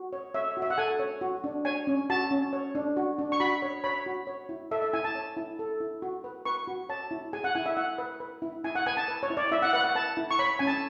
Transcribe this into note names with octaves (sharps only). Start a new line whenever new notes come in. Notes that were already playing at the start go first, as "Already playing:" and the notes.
Already playing: F#4
C#5
C#5 E5
F#4
E5
F#5
A4 G#5
C#5
F#4
D4
C#5 G#5
C#4
F#4 A5
C#4
C#5
D4
F#4
D4
C#6
F#4 B5
C#5
C#5 B5
F#4
C#5
E4
A4 E5
E5
E4 G#5
A5
C#5
E4
A4
E4
F#4
B4
B4 C#6
F#4
C#5 A5
E4
G#4 G#5
F#5
E4 G#5
E5
E4 F#5
B4
B4
E4
E4 G#5
F#5
B4 G#5
A5
B4
C#5
E4
D5
E4 E5
F#5
B4 F#5
F#5
B4 A5
E4
C#6
C#5 B5
C#4 G#5
A5